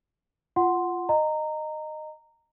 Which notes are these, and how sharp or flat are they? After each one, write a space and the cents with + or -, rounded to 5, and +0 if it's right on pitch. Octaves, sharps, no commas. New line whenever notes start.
F4 -10 F#5 +0 C6 +0
D#5 -15 A#5 -15